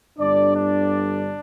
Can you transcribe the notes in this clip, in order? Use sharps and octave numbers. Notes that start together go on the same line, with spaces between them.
G1 G2 D3 D4 D5
D4 D5